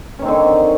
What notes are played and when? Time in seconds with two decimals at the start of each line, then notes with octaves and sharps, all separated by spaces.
0.19 C#4
0.22 D#3
0.25 C4
0.28 D3